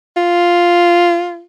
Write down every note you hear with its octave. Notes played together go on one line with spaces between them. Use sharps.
F4